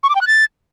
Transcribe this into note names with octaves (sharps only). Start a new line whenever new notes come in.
C#6
D6
G5
F#6
A6